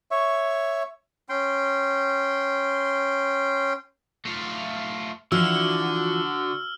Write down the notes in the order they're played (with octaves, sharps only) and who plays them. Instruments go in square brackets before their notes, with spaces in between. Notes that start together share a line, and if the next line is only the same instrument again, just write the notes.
[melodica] C#5 E5 C#6
C#4 G5 C6
[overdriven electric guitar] A3 F4
[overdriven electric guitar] D3 [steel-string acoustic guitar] E3 F3 E4 [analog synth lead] F#4 [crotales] E6 F6